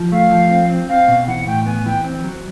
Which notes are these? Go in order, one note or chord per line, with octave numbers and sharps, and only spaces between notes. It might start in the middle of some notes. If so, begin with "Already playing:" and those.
Already playing: F3
A3 F5
F3
C4
C4
C4 F5
B2
E3 F#5
A2 G5
B3 G#5
E3 G5
C4
F#3